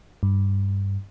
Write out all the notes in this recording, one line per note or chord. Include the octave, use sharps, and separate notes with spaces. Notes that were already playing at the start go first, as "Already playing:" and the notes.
G2